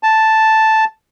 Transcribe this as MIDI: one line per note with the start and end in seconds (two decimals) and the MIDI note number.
0.03 0.85 81